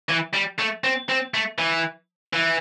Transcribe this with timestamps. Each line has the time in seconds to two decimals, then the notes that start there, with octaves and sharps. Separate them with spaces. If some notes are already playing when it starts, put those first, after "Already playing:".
0.09 E3
0.34 G3
0.59 A3
0.84 C4
1.09 C4
1.34 A3
1.58 E3
2.33 E3